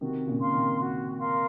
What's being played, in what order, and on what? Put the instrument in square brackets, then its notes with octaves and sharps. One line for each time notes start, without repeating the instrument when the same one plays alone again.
[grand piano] C3 D#3 [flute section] F#4
[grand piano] A#2 C#3
[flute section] A#4 F5 C6
[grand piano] C3 D#3
[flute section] F#4
A#4 F5 C6